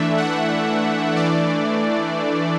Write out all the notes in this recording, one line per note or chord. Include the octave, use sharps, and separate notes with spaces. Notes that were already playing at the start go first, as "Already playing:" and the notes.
Already playing: E3 A3 D4 E5
F#5
E3 A3 D4 D5